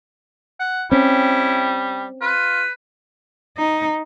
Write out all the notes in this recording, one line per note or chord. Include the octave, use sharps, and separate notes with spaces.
F#5
G3 C4 C#4 E4
F4 B4
D#4